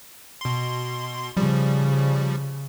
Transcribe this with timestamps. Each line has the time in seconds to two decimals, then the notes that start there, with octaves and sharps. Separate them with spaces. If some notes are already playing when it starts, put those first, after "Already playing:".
0.41 B2 C6
1.37 C#3 F3 G3